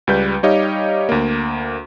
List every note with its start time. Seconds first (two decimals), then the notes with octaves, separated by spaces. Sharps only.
0.07 C#2 G3 B4 G6
0.43 G3 D#4 G4 C#5 D#5 F5
1.09 D2 A#3